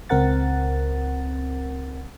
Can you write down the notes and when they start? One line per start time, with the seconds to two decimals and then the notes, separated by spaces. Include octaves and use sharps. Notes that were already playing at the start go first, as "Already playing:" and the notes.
0.09 C#2 C4 A#4 F#5 A6